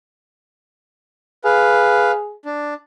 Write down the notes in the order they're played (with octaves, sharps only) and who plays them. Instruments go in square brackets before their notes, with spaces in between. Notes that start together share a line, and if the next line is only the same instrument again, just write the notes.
[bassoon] G#4 [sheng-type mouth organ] B4 F5
[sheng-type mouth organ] D4